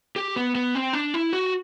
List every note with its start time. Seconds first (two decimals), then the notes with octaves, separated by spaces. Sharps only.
0.16 G4
0.36 B3
0.55 B3
0.75 C4
0.93 D4
1.14 E4
1.33 F#4